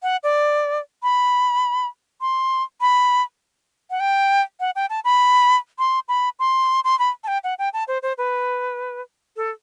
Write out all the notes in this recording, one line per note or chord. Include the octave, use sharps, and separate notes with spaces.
F#5
D5
B5
C6
B5
F#5
G5
F#5
G5
A5
B5
C6
B5
C6
C6
B5
A5
G5
F#5
G5
A5
C5
C5
B4
A4